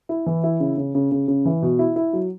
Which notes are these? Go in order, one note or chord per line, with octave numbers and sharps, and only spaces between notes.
E4
E3
E4
C#3
C#3
C#3
C#3
C#3
E3
B2
E4
E4
F#3